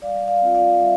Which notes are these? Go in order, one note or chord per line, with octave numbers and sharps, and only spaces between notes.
G3 D5 F5
D5 F5
C4 F4
D5 F5
G3 E5